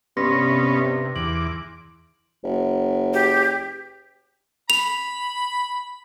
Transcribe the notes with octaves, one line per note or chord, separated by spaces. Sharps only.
G2 C3 B3 C#4 C6 A#6
E2 D6 F#7
F#1
G4
B5 F7